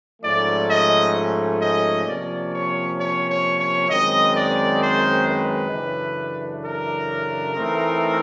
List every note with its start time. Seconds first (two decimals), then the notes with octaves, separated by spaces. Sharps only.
0.22 G#2 F3 A3 C#4 D5
0.68 D#5
1.60 D#5
2.05 C3 F3 A#3 C#4 D5
2.52 C#5
2.97 C#5
3.28 C#5
3.58 C#5
3.89 F#2 D#3 G#3 C4 D#5
4.34 D5
4.81 C5
5.25 B4
5.71 F#2 C#3 E3 A3 D4
6.63 A#4
7.54 E3 A3 C4 D#4